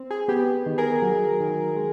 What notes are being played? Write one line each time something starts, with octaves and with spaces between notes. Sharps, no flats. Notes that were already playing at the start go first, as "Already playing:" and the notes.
Already playing: C4
G#4
B3 G4
D#3
G#4 A#4
F#3
D#3
G#3